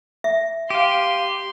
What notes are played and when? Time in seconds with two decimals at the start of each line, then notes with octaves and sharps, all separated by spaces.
0.24 E5
0.70 G4 F5 C6 D#7